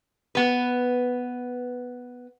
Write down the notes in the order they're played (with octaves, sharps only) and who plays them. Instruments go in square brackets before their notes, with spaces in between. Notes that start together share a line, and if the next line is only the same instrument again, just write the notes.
[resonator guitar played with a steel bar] B3 B4